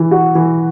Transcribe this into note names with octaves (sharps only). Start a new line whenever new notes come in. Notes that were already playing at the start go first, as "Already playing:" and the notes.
Already playing: E3
F#4
E3